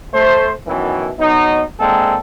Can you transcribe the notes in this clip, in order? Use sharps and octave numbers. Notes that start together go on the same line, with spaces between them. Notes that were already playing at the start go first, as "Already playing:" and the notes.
A3 C5
F#2 B2 D#3 E3
F#3 B3 D#4
G#3 A#3 C4 D4 A4